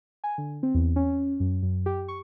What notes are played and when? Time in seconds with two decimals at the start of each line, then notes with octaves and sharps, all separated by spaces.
0.24 G#5
0.38 D3
0.63 C4
0.74 E2
0.96 C#4
1.40 F#2
1.63 F#2
1.86 G4
2.08 C#6